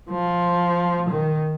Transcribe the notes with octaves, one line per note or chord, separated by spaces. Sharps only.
F3
D#3